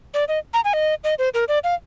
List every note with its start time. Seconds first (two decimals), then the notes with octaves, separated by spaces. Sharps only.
0.14 D5
0.28 D#5
0.54 A#5
0.64 G#5
0.73 D#5
1.04 D#5
1.19 C5
1.34 A#4
1.48 D5
1.64 F5